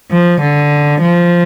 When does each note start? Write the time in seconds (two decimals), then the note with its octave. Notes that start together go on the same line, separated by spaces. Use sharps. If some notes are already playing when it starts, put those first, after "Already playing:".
0.11 F3
0.41 D3
1.01 F3